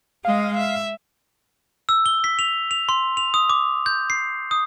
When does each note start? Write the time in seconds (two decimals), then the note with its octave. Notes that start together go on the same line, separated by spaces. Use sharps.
0.25 G#3 D#5 F5
0.57 E5
1.89 E6
2.06 G7
2.24 B6
2.39 F7
2.71 F7
2.89 C6
3.17 F7
3.34 D#6
3.50 D6
3.86 G6
4.10 C7
4.51 D#6